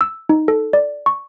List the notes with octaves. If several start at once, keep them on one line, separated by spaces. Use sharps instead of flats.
E6
D#4
A4
D5
C#6